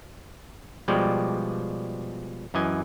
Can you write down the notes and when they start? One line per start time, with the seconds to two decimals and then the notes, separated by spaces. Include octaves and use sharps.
0.88 B2 F3 G3 G#3 D5 G5
2.54 F#2 E3 D#5 G#5